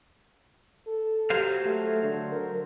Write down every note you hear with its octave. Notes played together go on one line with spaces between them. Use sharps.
A4
F#3 G4 C5 F5
A3
D3
A#4